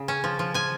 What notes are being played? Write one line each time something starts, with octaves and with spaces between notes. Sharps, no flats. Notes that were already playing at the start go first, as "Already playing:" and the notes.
Already playing: C#3
C#4
F3
F3
F3 G#5